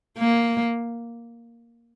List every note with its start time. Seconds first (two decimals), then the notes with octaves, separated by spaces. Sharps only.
0.19 A#3